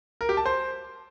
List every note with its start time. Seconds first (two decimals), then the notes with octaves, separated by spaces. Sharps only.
0.21 A#4
0.29 G4
0.37 A5
0.46 C5